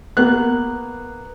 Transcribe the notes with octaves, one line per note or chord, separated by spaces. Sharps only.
A#3 B3 F#6